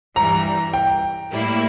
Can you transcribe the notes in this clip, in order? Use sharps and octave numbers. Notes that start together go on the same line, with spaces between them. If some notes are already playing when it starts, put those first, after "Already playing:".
G2 E3 G3 A#5
G5
A2 G3 A#3 E4